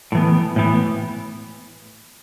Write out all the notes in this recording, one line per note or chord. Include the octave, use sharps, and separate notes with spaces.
A2 E3 B3
A2 E3 B3